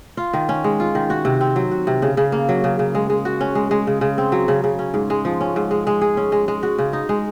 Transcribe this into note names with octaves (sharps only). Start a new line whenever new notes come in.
F4
D#3
C#4
G#3
F4
D#3
F#4
C3
C4
F#3
F#4
C3
C#3
C#3
A#3
F#3
C#3
C#3
G#3
G#3
F#4
C#4
G#3
G#3
C#3
C#3
C4
F#3
C#3
C#3
C#4
G#2
G#3
F3
C#4
G#2
G#3
G#3
G#4
C#4
G#3
G#3
F#4
C#3
D#4
G#3